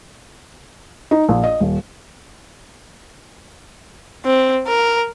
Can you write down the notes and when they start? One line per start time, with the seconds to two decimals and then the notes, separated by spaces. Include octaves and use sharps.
1.11 D#4
1.29 A#1
1.43 D#5
1.60 D#1
4.25 C4
4.67 A#4